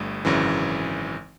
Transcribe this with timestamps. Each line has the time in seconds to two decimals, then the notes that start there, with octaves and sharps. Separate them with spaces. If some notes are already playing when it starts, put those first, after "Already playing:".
Already playing: G1 G2 A3
0.25 G#1 F#2 C#3 E3